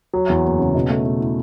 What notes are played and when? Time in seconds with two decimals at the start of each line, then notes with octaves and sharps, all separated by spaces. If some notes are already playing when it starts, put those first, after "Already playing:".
0.14 F#3
0.30 E2
0.45 F#1
0.59 C#3
0.75 B2
0.90 A3
1.06 B2
1.20 E4